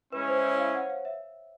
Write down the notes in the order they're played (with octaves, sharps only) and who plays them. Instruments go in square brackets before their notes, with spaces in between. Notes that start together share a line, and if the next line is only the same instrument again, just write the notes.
[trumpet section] G#3 C#4 E4 [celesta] B4
[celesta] C5
C#5
F5
F#5
F5
E5